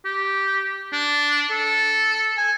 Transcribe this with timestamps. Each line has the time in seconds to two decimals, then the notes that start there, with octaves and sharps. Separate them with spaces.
0.05 G4
0.93 D4
1.51 A4
2.37 G#5